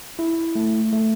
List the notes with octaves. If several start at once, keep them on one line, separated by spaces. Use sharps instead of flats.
E4
A3
A3